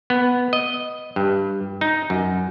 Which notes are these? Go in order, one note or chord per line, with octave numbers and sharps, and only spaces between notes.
B3
D#5
G2
D#4
F#2